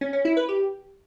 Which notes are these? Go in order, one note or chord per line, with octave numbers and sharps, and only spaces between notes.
C#4
C#4
E4
B4
G4